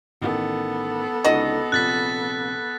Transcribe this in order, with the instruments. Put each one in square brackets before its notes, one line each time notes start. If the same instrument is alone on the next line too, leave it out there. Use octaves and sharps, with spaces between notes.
[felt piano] A1 D#3 [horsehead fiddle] B3 A4
[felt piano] C#2 D3 D#4 [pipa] F#4 D#5
[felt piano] A#1 C3 [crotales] F#6 A6 B6